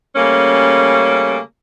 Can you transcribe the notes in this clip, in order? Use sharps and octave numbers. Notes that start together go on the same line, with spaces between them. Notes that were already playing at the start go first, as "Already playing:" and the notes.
C#3 G3 A3 A#3 C#4